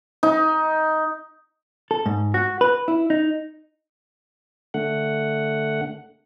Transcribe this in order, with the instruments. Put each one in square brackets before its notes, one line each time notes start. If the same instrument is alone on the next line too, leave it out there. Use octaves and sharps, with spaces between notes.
[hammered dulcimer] D#4
[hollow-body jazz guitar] A4
G#2
F#4
B4
E4
D#4
[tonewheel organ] D3 A3 F#5